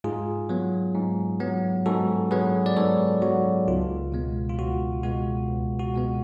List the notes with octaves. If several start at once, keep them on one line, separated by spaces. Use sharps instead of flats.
G#2 F4 G#4
F#3 B3
G#2
F#3 B3
G#2 F#4 A4
F#3 B3 G#4 B4
D5
G#2 A4 C#5
F#3 B3 F#4
C#2 F4
B2 G#3 B3
F4
C#2 F#4
B2 G#3 B3 F#4
C#2
F#4
B2 G#3 B3